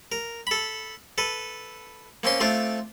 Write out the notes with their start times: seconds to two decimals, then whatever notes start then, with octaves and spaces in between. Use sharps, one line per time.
0.12 A#4
0.47 A4 B5
1.18 A4 B4
2.23 A#3 C4 C#4 C6
2.40 A3 C4 D4 F4